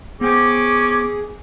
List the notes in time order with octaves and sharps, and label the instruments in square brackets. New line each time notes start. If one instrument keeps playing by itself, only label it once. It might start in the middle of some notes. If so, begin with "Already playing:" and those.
[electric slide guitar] B3 C5 G5 [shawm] C#4 [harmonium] G#4 [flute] D6